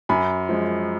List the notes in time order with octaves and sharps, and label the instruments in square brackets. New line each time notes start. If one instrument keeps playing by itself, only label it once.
[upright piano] F#2 G#5 B5
F3 G#3